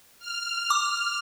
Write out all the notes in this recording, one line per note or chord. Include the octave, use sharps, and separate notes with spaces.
F6
D6